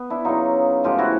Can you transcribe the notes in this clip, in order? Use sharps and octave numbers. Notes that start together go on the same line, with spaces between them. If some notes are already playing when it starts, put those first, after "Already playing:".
Already playing: B3
D4 E4
C#3 F#3 D#4 F4
A2 F3 G#3 F4 G4
E4 F#4